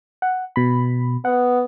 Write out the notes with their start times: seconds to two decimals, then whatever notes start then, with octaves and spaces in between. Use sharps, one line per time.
0.22 F#5
0.56 B2 B5
1.25 B3 F#5